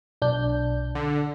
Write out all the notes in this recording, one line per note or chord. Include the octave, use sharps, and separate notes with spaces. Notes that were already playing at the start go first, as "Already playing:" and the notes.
B1 D4 G6
D3